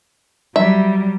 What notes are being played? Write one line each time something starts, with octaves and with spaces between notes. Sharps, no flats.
F#3 G3 E5